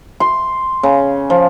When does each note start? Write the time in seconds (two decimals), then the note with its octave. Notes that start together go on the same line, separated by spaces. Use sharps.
0.20 C6
0.83 C#3
1.30 F3